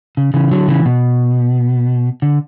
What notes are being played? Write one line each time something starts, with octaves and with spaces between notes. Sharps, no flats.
C#3
C#3 E3
D3 F#3
C#3 E3
B2
D3